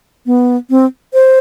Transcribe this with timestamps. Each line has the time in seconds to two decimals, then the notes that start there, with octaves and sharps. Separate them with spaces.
0.26 B3
0.70 C4
1.14 C5